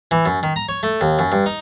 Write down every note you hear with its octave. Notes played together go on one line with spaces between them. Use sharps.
E3
F#2
D#3
A#5
C#5
A3
D#2
F#2
G2
D#4